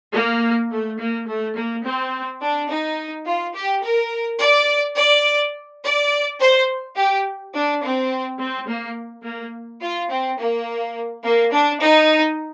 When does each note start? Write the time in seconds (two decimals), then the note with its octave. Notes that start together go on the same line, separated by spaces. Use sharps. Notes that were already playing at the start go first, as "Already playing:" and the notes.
0.13 A#3
0.70 A3
0.99 A#3
1.27 A3
1.56 A#3
1.83 C4
2.41 D4
2.69 D#4
3.25 F4
3.54 G4
3.83 A#4
4.40 D5
4.97 D5
5.83 D5
6.40 C5
6.96 G4
7.53 D4
7.82 C4
8.39 C4
8.68 A#3
9.24 A#3
9.81 F4
10.10 C4
10.38 A#3
11.24 A#3
11.52 D4
11.81 D#4